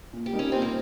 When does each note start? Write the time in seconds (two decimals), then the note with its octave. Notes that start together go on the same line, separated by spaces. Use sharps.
0.13 A#2
0.26 G4
0.33 G3 A#3 D#4
0.39 C#4
0.52 A#2 C4
0.62 A#3